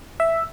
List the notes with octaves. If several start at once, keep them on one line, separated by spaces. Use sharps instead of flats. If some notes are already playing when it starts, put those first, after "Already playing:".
E5